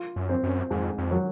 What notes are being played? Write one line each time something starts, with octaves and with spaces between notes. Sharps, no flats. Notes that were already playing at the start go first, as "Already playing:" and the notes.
Already playing: F4
F#2
C4
F#2
F2 G#2
F2
F#3